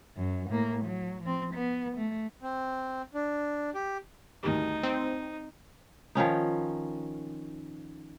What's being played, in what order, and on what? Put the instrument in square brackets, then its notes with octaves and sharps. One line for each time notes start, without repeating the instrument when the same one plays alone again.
[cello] F#2
A2 A#3
F#3
F3 C4
B3
A3
[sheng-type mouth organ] C4
D4
G4
[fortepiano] D2 D#3 G3 [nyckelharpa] D#4
[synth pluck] C4
[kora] D#3 F3 C#4 D#4